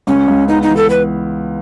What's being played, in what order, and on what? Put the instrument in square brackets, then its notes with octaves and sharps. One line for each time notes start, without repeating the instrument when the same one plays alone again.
[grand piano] C#2 [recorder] C#4
[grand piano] C#2
[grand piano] B3 [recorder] D#4
[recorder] D#4
[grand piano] E3
[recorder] A4
B4